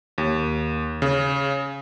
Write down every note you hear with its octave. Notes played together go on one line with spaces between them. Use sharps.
D#2
C#3